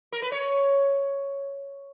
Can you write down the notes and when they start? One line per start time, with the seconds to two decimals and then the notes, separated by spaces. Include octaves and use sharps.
0.12 A#4
0.22 B4
0.32 C#5